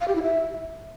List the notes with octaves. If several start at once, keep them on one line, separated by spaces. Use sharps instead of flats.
F5
G4
E4
E5